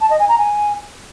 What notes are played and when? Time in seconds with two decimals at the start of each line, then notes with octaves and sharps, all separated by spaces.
0.01 A5
0.10 D#5
0.19 G#5
0.29 A#5
0.38 G#5